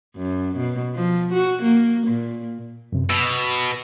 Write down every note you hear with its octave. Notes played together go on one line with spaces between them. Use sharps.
F#2
B2
F3
F#4
A#3
A#2
F#2 C3
B2 E6